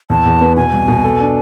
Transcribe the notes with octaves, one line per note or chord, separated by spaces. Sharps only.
E2 A5
E2
B3
B2 G#5
C2
B2
A4
D4